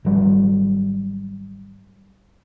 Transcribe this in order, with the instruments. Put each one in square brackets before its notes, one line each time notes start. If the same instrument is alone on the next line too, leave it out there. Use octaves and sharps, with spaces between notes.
[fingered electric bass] G#1 F#3 G3